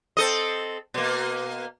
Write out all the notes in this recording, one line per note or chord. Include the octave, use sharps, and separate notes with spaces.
C4 A4 D#5
B2 A#3